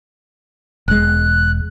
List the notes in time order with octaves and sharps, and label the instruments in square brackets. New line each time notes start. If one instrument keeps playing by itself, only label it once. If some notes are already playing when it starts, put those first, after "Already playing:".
[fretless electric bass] E1 G#3 [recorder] F#6